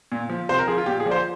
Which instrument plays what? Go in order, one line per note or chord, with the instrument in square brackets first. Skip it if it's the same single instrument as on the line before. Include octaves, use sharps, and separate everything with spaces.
[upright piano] A#2
F3
C3 C5
A#4
F3 G#4
F4
A#2 G4
G#4
F3 D5
C5